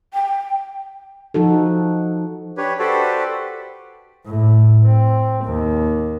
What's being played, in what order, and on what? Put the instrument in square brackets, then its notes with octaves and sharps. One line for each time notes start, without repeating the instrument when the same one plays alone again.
[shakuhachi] G5
[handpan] F3 D#4 F#4 A4
[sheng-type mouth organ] D4 G4 B4 C#5
F#4 G4 A4 B4 C5 D5
[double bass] A2
C4
D#2